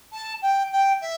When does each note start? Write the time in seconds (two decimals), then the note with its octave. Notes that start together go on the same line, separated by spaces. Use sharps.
0.13 A5
0.42 G5
0.72 G5
1.02 E5